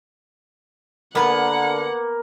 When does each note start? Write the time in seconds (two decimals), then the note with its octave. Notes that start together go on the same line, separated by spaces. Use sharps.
1.15 D3 A#3 B3 B4 F#5